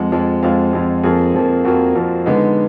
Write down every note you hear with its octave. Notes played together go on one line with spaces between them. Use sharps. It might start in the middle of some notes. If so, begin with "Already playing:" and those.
Already playing: F2 F3 G#3 F#5
F2 F3 G#3
F2 F3 G#3 F5
F2 F3 G#3
F2 F3 A#3 G#4
F2 F3 A#3
F2 F3 A#3 F#4
F2 F3 A#3
D3 G#3 B3 D#4